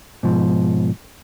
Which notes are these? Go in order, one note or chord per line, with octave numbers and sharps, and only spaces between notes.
G#2 B2 F3